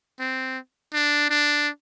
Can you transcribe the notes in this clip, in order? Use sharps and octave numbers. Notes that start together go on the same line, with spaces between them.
C4
D4
D4